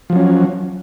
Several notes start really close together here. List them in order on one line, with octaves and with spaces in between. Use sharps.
F3 F#3 C#4